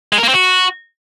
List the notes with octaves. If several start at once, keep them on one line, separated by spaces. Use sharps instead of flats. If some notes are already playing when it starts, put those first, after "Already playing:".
G#3
A#4
A#3
C4
F#4